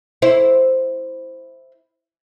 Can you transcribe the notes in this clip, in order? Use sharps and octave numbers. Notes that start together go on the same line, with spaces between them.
E4 C5